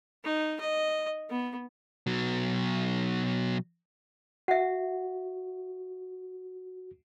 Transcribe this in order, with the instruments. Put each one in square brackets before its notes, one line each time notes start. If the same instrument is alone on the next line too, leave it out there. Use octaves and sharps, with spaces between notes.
[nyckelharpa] D#4
D#5
B3
[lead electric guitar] B2 F#3
[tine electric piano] F#4 [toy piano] E5 F#5